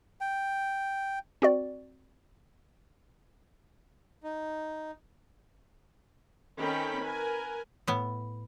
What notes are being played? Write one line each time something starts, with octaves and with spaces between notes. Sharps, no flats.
G5
C4 F#4 D5
D#4
D#3 C4 C#4 A4 G5 B5
A#4 B4 G#5
A2 B3